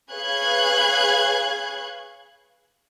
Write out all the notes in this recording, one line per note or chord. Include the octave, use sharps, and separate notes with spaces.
G#4 B4 C#5 F5 F#6 G#6